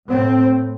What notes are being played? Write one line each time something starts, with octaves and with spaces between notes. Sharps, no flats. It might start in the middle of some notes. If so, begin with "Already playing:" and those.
A2 C4